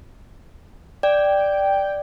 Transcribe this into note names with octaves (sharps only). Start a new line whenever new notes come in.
D5 G5